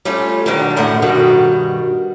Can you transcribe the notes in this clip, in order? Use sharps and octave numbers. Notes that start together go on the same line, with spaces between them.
G3 A3 C#4 F4
B2 D3 D#3 F#3 G3 D4
F#2 A2 D3 A3 F#5
G2 B2 D#3 G3 F#4